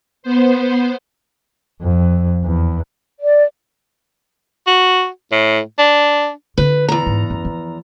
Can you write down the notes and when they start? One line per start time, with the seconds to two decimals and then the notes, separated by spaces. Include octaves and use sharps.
0.23 B3 C5
1.82 F2
2.44 E2
3.20 D5
4.67 F#4
5.32 A2
5.79 D4
6.58 D3 F4 B4
6.88 E2 A#5
7.06 G#2
7.30 F#2
7.45 F3